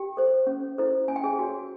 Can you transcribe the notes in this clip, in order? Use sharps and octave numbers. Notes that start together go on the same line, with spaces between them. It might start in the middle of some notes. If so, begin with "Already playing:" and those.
Already playing: G4 G5
A4 C5
C#4
E4 A4 C5
C#4 G#5
G5
G#4 G#5
F#4 A4 C#5